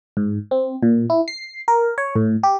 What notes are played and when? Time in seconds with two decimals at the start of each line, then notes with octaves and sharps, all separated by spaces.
0.17 G#2
0.51 C4
0.83 A#2
1.10 E4
1.28 C7
1.68 A#4
1.98 C#5
2.16 A2
2.43 G4